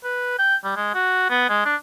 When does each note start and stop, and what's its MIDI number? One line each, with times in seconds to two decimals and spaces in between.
0.04 0.35 71
0.39 0.56 79
0.64 0.72 55
0.76 0.93 56
0.94 1.28 66
1.30 1.45 59
1.49 1.64 56
1.65 1.75 62